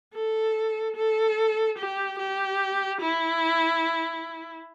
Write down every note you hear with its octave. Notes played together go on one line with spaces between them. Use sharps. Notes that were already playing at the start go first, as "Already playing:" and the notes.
A4
A4
G4
G4
E4